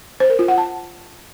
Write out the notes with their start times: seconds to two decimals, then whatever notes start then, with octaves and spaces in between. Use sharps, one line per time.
0.20 C5
0.30 A#4
0.39 F4
0.48 F#5
0.58 A5